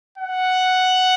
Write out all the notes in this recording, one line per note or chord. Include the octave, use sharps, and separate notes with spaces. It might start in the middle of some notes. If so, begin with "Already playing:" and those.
F#5